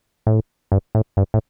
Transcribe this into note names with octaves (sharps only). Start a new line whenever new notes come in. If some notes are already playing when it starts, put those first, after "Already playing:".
A2
G2
A2
G2
A2